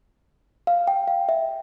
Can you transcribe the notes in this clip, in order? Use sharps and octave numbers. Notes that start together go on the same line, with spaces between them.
F5
G5
F5
E5